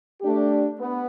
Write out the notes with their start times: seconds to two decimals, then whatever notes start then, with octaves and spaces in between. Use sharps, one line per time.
0.22 A3 D4 G4
0.78 B3